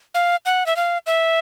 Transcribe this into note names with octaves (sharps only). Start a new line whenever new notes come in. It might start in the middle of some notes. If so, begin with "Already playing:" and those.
F5
F#5
E5
F5
E5